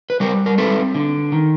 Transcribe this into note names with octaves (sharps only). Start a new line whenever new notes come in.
B4
G3 A#4 C5
A#4
C4 A4 B4
D3
D#3